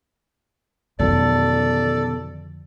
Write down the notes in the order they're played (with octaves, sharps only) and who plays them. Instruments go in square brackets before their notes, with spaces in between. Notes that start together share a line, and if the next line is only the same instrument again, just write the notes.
[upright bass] F2 D3 [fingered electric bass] B2 D#3 F#3 [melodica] A4 [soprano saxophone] D5